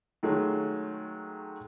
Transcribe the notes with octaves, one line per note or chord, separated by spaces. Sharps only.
D#3 F#3 G#3 A3